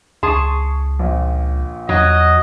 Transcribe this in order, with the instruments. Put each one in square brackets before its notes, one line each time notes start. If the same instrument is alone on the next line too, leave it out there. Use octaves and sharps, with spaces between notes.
[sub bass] C#2 [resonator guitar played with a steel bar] G#4 A5 [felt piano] C6 C#6
[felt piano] A#1 A#2
[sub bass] E2 [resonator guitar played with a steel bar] F#3 [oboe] D#5